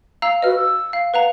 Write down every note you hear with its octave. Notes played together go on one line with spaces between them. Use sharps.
F5 A#5 E6
F#4 B4 D#5 F6
E6
F5
B4 F5 F#5 A#5